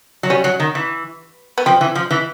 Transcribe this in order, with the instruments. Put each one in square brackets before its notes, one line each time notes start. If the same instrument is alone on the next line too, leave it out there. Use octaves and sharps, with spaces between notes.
[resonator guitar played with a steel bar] F#3
[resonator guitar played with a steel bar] G3 [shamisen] C#4
[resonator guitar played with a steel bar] F#3
D#3
E3
[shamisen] B3
[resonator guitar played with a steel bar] F3 [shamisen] C4
[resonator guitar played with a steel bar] E3
F3
E3